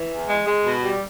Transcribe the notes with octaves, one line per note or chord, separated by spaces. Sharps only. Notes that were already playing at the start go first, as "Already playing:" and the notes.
Already playing: E3
E2
G#3
G#3
B2
G3